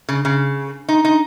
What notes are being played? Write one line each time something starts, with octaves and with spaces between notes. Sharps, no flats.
C#3
C#3
D#4
D#4